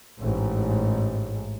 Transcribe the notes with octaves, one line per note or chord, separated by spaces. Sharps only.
A1 G#2